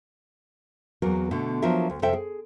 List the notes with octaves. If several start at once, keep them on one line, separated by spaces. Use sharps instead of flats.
E2 F#3 A#3 A#4
B2 D3 A3
F3 F#3 B3 D4 A#4 E5
D2
F2 C3 A4 C5 E5 G5
G#4